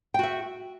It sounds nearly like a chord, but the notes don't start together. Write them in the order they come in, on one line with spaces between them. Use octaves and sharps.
G5 F#4 E5